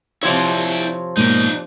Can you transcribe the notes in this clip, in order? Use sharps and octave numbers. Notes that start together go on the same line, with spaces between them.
C3 F3 E4 C#5 D5
G#2 B2 A#3 D#4 D5